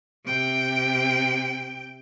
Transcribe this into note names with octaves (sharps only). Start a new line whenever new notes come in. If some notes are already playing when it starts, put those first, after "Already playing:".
C3 G5